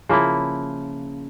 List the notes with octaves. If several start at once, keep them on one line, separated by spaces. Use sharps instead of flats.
C#3 F3 A#3 E4